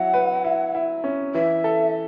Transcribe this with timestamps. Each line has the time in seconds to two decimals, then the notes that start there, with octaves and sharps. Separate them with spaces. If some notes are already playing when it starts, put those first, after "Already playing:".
Already playing: F#3 E4 F#5
0.14 B4
0.44 E4
0.75 E4
1.04 C#4
1.34 E3 E5
1.64 A4